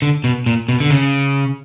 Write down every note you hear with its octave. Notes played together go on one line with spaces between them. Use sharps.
D3
B2
A#2
B2
D3
C#3